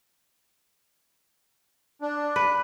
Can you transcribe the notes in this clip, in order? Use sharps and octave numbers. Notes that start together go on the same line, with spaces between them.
D4
B4